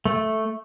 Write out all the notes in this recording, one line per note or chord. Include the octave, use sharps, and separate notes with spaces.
A3